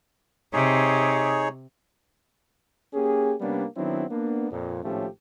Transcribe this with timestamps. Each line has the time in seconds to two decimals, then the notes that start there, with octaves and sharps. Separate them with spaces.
0.53 C3 D#4 G#4 C#5
2.94 A#3 C#4 G4 G#4
3.41 C3 G3 A#3 B3 C#4 D4
3.76 D#3 F#3 B3 C4 D4 E4
4.10 A#3 B3 D4
4.51 F2 A#2
4.83 G#1 A2 F3 A3 C#4 G4